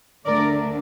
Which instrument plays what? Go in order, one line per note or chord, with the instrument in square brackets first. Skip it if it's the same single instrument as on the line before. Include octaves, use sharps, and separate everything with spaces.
[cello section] D2 D3 A3 D4 A#4 D5